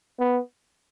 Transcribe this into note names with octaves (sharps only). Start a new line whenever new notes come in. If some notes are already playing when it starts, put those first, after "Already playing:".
B3